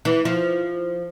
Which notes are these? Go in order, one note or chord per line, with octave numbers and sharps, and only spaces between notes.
E3
F3